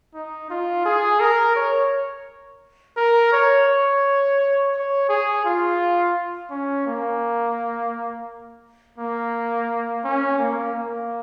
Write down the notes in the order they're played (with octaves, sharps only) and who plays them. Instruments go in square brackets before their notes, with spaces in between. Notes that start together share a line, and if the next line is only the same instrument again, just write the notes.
[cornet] D#4
F4
G#4
A#4
C#5
A#4
C#5
C#5
C#5
G#4
F4
C#4
A#3
A#3
C#4
A#3
A#3